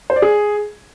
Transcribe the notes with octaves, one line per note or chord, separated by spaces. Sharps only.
C5
D5
G#4